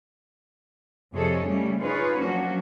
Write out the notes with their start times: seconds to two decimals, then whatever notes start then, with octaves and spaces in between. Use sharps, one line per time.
1.14 F2 C3 G#4 A4 C#5 D#5
1.44 C#3 G3 A3 C#4
1.80 D#4 F4 G#4 B4 C#5
2.18 F3 F#3 A#3 C#4 D4 F#4